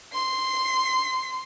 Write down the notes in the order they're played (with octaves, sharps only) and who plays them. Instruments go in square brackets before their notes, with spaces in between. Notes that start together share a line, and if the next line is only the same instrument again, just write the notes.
[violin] C6 C7